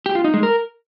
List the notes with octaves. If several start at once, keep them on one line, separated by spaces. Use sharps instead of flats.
G4
F4
D#4
G#3
A#4